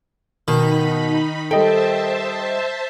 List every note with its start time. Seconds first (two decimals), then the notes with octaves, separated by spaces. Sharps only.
0.48 B2 D#3 D#4 B5
1.51 G3 A4 C5 D#5 E5 G5 A5